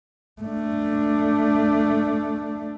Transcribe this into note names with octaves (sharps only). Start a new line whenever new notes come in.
A3 D4